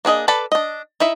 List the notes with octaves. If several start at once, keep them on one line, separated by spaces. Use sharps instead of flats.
A#3 D4 G#4 D#5
A4 B4 D5 A5 B5
D4 D#5
D#4 E4 E5